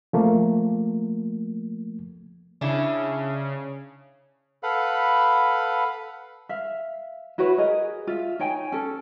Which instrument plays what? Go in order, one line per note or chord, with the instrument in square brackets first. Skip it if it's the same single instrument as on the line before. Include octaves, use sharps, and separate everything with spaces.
[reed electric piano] F3 A3 A#3
[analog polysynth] C#3 [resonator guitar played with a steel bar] D4 E4
[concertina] A4 B4 F5 F#5 B5
[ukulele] E5 F5
E4 F#4 B4 C#5
G#4 A#4 D#5
F4 E5
D#4 C#5 G5 G#5
C#4 A4